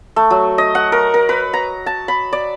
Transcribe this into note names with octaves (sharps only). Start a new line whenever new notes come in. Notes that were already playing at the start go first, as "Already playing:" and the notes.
A3
F#3
D#5
F#5
A#4
A#4
B4
A#5
A5
B5
D5